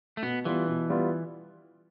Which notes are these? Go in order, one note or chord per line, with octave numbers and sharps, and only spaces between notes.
A3
B2 B3
E3 G3 B3 F4
B2
G3 B3 F4